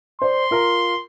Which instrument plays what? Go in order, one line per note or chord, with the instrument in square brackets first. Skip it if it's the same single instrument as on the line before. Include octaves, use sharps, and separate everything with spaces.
[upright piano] C5 D5 [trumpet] C6
[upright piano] F4 A#4 A#5